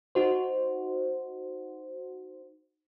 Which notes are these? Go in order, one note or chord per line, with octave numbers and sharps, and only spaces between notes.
D#4 F#4 C5